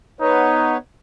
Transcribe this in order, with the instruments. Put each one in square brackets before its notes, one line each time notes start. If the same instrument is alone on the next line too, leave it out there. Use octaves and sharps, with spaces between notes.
[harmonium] B3 B4 C#5 [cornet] D#4